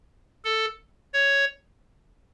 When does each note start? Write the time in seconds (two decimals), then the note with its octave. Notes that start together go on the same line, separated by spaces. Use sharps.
0.45 A4
1.14 C#5